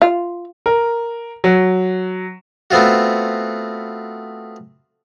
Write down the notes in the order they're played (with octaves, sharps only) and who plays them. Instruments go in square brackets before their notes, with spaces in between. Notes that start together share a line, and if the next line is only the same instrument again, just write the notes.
[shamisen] F4
[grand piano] A#4
F#3
[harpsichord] A3 B3 C4 F4 F#4